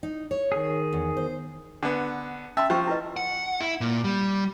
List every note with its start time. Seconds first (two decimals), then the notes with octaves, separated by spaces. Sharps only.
0.03 D#4
0.31 C#5
0.52 D#3 G#4
0.92 E2
1.17 C5
1.83 D3 B3 D4
2.57 C#4 E5 A5 C6 E6
2.70 F3 C5 G5 C#6
2.87 E4 B4 D#5
3.16 F#5
3.61 E4
3.81 A#2
4.04 G3